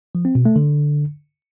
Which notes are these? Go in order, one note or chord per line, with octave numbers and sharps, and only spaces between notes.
F3
C4
B2
A3
D3